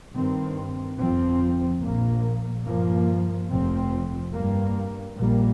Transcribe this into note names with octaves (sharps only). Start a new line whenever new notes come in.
G2 D#3 C4
G1 F2 F3 C4
A#1 A#2 A#3
G2 F3 A#3
F1 F2 C3 F3 C4
G2 G3 A#3
A#1 A#2 G3 A#3